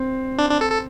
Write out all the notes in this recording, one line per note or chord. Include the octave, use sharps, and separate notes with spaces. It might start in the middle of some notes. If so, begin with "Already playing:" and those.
Already playing: C4
D4
D4
A4
A4